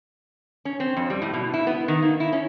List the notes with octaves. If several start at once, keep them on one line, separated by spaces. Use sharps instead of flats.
C#4
C4
F2
G3
A2
B2
E4
B3
D#3
A#3
E4
C#4